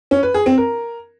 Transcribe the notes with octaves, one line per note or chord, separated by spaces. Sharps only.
C#4
B4
G#4
C4
A#4